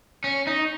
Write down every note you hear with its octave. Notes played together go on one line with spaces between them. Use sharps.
C#4
D#4